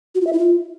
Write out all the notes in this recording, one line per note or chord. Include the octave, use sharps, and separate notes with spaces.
F#4
F4
E5
E4
F4